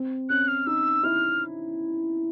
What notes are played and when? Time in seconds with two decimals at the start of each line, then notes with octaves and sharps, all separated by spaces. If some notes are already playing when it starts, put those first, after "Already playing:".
Already playing: C4
0.29 C#4 F#6
0.48 F6
0.67 D#4 E6
1.03 E4 F6